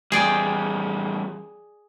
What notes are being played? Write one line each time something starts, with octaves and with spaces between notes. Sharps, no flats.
E2 G3 G#4 D5 G5